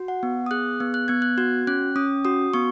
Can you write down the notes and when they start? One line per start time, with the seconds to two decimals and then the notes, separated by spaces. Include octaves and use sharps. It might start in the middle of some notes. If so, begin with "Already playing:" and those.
Already playing: F#4
0.08 F#5
0.23 B3
0.46 D#6
0.51 G#4 F#6
0.80 B3
0.94 F#6
1.08 B3 G#6
1.22 F#6
1.38 F#4 G#6
1.67 C#4 F#6
1.96 C#4 D#6
2.25 F#4 D#6
2.54 B3 C#6